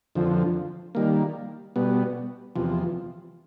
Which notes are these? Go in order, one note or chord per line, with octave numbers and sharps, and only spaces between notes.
F2 D3 F3
D#3 G3 A#3
B2 G3 B3
E2 C3 F3